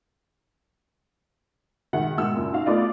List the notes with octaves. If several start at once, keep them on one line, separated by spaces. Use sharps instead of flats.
D#3 G#3 E5 F#5
G#2 B2 A#3 E6
F#1 A#2
D#4 F#4 F5
A3 B3 F4 D5 D#5 F5